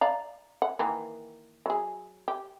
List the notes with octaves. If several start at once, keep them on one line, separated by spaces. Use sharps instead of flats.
D5 F5 A#5
F#5
D#3 E3 A#3
F#3 G#4
G4